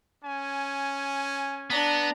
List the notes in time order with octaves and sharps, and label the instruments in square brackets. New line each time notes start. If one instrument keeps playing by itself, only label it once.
[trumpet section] C#4 G#5
[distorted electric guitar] B3 [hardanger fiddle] D4 A#5